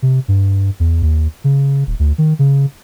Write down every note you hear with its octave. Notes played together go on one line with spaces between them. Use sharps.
C3
G2
E2
D#2
C#3
D#1
D2
D#3
C#3